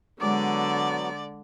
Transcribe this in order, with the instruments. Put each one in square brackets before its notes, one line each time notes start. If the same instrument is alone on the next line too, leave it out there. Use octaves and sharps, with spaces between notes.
[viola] D3 [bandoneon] F#3 B3 [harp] G#3 D6 [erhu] D5